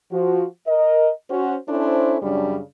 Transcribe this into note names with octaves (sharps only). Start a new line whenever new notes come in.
F3 F#4
A#4 D#5
C#4 F#4 C5
C#4 D4 E4 A4 C5
F#2 C#3 G3 D4